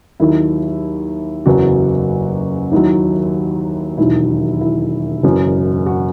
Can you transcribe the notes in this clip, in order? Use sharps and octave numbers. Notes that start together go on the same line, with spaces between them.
D#2 D#3 F#3 E4
F#1 E2 C#3 F#3 F#4
D#2 D#3 F#3 E4
E1 D#2 D#3 F#3 E4
E4
F#1 F#2 E3
F#4